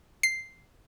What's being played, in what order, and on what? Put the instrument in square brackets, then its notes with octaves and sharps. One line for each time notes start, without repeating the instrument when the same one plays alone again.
[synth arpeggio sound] C7